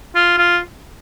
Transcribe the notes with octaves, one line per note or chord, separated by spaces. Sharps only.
F4
F4